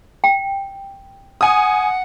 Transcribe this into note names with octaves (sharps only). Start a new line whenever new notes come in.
G5
F#5 G#5 D#6